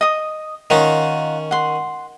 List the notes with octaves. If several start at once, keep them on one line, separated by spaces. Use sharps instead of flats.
D#5 D#6
D#3 C#4 D#4 F4 F#5
F#5 C6